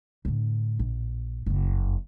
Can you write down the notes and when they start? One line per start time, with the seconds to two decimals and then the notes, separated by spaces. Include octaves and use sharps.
0.25 A2 D3
0.79 A#1
1.46 F#1 F2